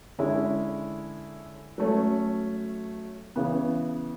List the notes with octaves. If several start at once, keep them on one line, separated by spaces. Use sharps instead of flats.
D3 G#3 C#4 E4
F#3 A3 C#4
C#3 E3 B3